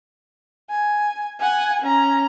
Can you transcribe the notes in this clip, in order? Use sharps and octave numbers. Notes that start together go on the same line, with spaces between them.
G#5
F#5 G#5
C#4 A#5